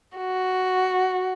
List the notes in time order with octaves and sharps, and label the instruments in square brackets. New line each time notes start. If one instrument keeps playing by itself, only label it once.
[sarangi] F#4